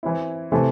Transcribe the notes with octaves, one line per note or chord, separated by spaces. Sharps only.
E3 C4 E4
C3 E3 A3 C4 A4